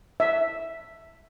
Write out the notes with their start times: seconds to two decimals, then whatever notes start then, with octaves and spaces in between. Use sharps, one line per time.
0.20 E5